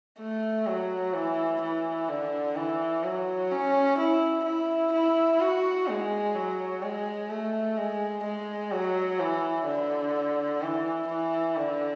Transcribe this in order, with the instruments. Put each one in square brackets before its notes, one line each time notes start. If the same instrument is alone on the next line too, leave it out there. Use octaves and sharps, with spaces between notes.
[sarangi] A3
F#3
E3
E3
D3
E3
F#3
C#4
E4
E4
E4
F#4
G#3
F#3
G#3
A3
G#3
G#3
F#3
E3
D3
E3
E3
D3